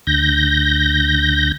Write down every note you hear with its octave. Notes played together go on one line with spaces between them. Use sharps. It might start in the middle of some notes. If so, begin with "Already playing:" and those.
D2 G6 A#6